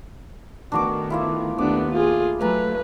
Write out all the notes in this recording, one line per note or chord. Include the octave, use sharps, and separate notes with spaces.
D#3 A3 B3 D4 F#4 D6
E4 F4 E5
D#2 A3 B3 D4 D6
F4 G#4
F#3 A3 B4 G#5 A#5